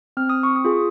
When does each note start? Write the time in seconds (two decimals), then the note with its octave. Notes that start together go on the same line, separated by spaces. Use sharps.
0.17 C4 F6
0.29 D#6
0.43 C#6
0.56 D#6
0.65 F4 G#4